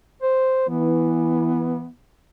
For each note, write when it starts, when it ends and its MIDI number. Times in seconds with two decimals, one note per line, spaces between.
0.23 0.67 72
0.69 1.85 52
0.69 1.90 59